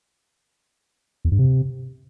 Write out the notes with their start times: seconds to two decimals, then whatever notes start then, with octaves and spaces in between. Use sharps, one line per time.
1.25 E2
1.32 G2
1.39 C3